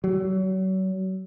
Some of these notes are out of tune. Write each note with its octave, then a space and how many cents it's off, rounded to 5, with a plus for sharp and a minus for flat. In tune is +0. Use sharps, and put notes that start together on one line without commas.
F#3 +35